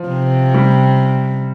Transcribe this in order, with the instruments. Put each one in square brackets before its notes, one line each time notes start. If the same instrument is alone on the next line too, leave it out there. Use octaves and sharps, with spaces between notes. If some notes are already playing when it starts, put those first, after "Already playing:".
Already playing: [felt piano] F3
[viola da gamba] C3
[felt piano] G3